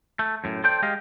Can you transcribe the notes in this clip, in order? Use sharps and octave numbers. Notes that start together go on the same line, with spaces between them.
A3
F#2 A2
A4 C5 D5 G5
G#3 G4 D#5 F5